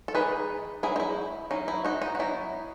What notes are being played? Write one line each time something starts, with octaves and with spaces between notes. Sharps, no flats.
A4
E3 B3 D#4 G#4 B4
F#3 B3 D#4 E4 G#4
D#4
E4
F#3 C#4 D#4
E4
D#4 F#4
D#4
F#4
F#3 B3 D#4 E4